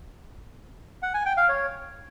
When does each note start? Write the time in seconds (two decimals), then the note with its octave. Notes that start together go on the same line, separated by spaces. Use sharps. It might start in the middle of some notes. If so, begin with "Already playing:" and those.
1.03 F#5
1.14 G#5
1.26 G5
1.37 F5
1.49 C#5